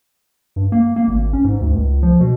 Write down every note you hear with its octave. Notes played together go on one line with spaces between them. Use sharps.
G2
A#3
A#3
G#1
C#4
G#2
D2
C#2
F3
B2